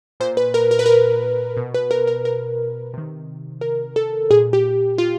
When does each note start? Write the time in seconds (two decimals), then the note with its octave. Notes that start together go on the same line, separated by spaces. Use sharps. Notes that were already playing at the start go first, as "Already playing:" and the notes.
0.20 A#2 C5
0.37 B4
0.54 A#4
0.71 A#4
0.79 B4
0.86 A#4
1.57 B2
1.74 B4
1.91 A#4
2.07 A#4
2.25 A#4
2.93 C3 D#3
3.61 A#4
3.96 A4
4.30 A#2 G#4
4.53 G4
4.98 F4